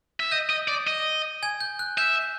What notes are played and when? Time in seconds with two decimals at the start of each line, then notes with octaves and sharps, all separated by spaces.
0.20 E5
0.31 D#5 G6
0.50 D#5
0.68 D5
0.87 D#5
1.43 G#5 G#6
1.60 G6
1.79 F#6
1.98 E5 G6